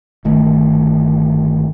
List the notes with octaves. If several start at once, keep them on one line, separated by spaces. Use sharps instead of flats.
G1 D#3 A3